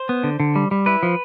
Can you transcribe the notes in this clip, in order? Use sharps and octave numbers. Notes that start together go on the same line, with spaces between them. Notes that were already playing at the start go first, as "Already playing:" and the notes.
Already playing: C5
B3
D3
D3
G3
G3
E4 B4
F3